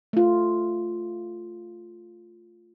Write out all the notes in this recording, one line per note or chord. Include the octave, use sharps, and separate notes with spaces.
A3 F4